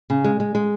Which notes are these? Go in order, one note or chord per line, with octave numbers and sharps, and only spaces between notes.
C#3
G#3
G#3
G#3